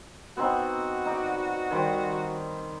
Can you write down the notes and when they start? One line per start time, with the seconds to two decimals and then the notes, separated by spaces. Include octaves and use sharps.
0.37 B3 C4 D#4 F#4
1.06 D#4 D5
1.71 D#3 G3 C5